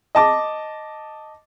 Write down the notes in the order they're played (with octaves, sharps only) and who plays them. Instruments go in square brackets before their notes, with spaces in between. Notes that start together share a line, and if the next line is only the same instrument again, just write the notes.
[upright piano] D#5 A5 D6